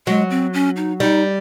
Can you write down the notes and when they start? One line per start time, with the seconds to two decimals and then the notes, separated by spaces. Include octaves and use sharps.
0.07 F#3 G#3
0.30 C4
0.54 C#4
0.77 D#4
1.00 G3 D#4